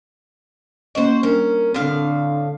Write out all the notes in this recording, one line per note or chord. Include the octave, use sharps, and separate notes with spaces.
A#3 C#4 F#4 C5 D#5
G3 C#4 D4 A#4
A2 D3 C4 F5